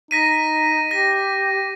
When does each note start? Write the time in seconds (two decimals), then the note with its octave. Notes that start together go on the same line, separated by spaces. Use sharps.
0.11 D#4 A#6 B6 D#7
0.91 G4 A#6